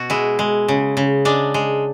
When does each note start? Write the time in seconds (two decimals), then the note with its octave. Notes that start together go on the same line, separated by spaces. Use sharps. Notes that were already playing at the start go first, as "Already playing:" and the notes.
Already playing: B2 F#4
0.10 G#3 E4
0.39 G#3
0.68 C#3
0.97 C#3
1.25 G#3 D4
1.54 G#3